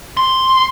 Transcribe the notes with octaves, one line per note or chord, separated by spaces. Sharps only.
C6